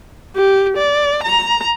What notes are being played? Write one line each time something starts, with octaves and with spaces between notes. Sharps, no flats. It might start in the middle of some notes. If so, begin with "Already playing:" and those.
G4
D5
A#5